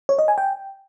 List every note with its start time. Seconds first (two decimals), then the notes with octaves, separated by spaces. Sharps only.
0.09 C#5
0.19 D#5
0.28 G#5
0.38 G5